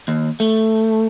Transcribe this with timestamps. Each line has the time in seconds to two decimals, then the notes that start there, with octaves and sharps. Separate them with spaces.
0.08 D#2
0.40 A3